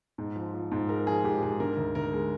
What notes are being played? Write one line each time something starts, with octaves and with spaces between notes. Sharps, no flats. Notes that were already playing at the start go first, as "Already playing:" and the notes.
G#2
F3
F3
G#2
G#3 A#4
F3 G#4
G#2 G4
G#2 G#4
D3 A#4
D2
D2 A#4
G#3